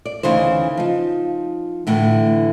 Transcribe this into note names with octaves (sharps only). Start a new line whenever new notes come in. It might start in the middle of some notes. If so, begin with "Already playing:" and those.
D5
D2 C#3 E3 D#4 C5
F3 D#4
A2 D3 E3 A3